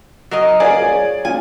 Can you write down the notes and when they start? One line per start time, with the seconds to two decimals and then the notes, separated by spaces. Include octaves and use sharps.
0.31 F#3 A#4 D#5
0.60 F4 G#4 A#4 C#5 D5 G#5
0.82 C#5
1.25 C#4 D#4 F4 G#5